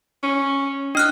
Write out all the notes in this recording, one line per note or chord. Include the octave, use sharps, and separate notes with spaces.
C#4
D4 D#5 F6 F#6